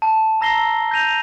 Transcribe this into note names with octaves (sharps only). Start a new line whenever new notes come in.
A5
A5 A#5 E6 A#6 C7 G7
G6 A#6 D#7 F7